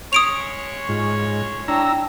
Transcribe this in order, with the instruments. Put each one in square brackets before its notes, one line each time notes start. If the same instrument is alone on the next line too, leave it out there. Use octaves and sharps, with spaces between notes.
[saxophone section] G#3 C#4 C#5 [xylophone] D#6 D7 F7
[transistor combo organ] G#2 [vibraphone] F4
[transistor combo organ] D4 A#5 E6 [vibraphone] E4 G5 A5